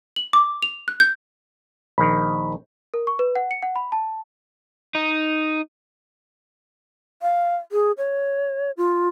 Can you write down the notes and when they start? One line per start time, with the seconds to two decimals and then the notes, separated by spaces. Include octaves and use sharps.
0.16 F#7
0.33 D6
0.62 F7
0.88 F#6
1.00 G6
1.98 A#1 D#3 B5
2.94 A#4
3.07 C#6
3.19 B4
3.36 F#5
3.51 C#7
3.62 F#5
3.76 B5
3.92 A5
4.95 D#4
7.22 F5
7.72 G#4
7.98 C#5
8.77 F4